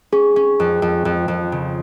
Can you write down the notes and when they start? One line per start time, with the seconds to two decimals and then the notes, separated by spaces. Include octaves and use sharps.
0.12 C#4 G#4
0.36 C#4
0.60 F2
0.82 F2
1.05 F2
1.28 F2
1.52 C#3